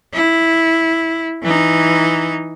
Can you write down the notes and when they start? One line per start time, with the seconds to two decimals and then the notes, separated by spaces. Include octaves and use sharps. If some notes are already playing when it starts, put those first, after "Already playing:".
0.13 E4
1.42 E3 D#4